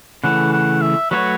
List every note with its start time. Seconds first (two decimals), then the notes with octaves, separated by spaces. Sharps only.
0.24 C#3 E3 A3 F#5
0.53 F#5
0.82 E5
1.11 F#3 A3 F#4 B4 C#5